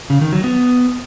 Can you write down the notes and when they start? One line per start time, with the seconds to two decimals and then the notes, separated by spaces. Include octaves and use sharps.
0.10 C#3
0.21 D#3
0.33 F#3
0.44 B3